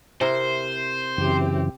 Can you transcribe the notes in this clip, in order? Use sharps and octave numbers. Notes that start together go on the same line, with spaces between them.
C3 E4 A#4 C5
F#2 C#3 E3 C4 G4